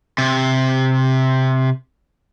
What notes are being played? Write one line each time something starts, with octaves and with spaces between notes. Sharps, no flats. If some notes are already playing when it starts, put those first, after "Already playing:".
C3